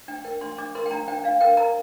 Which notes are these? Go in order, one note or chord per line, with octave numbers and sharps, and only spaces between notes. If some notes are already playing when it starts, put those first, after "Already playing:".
D4 G5
A#4 G5
D4 C6
D4 D6
A#4 C6
G5
D4 A#5
D4 G5
D4 F5
A#4 G5
A#4 A#5